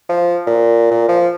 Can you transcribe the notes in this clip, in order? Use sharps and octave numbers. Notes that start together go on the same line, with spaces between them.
F3
A#2
A#2
F3